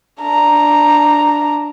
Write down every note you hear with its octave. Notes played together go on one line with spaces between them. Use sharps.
D4 A#5